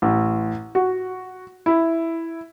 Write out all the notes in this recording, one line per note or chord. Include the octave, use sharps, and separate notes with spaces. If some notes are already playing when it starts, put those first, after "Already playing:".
A1
F#4
E4